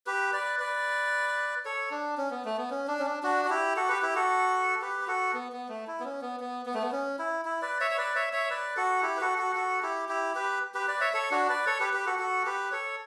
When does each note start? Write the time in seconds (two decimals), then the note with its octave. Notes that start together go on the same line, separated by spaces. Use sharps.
0.06 G4 B4
0.33 B4 D5
0.59 B4 D5
1.65 A4 C#5
1.91 D4
2.18 C#4
2.31 B3
2.45 A3
2.58 B3
2.71 C#4
2.88 D4
2.99 C#4
3.06 D4
3.23 D4 F#4
3.45 F#4
3.50 E4 G4
3.76 F#4 A4
3.89 G4 B4
4.02 E4 G4
4.15 F#4 A4
4.82 G4 B4
5.01 B4
5.07 F#4 A4
5.34 B3
5.52 B3
5.69 A3
5.87 E4
6.00 B3
6.04 C#4
6.22 B3
6.40 B3
6.66 B3
6.74 A3
6.82 B3
6.92 C#4
7.19 E4
7.45 E4
7.62 B4 D5
7.80 C#5 E5
7.91 C#5
7.97 B4 D5
8.15 C#5 E5
8.33 C#5 E5
8.50 B4 D5
8.76 F#4 A4
9.03 E4 G4
9.17 B4
9.21 F#4 A4
9.38 F#4 A4
9.55 F#4 A4
9.82 E4 G4
10.09 E4 G4
10.35 G4 B4
10.74 G4 B4
10.87 B4 D5
11.01 C#5 E5
11.13 A4 C#5
11.31 D4 F#4
11.49 B4 D5
11.66 A4 C#5
11.80 G4 B4
11.93 G4 B4
12.06 F#4 A4
12.19 F#4 A4
12.45 G4 B4
12.72 A4 C#5